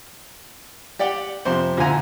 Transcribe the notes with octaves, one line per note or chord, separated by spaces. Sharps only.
G4 D5 F#5 G5
F2 C3 C5
D2 A#2 E4 F5 G#5 A#5